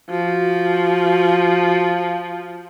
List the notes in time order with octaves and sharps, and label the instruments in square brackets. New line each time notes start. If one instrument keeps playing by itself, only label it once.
[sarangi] F3 [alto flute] F#4